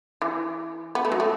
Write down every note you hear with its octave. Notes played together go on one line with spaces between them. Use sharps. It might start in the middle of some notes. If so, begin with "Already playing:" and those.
E3
B3
A3
F#3
A3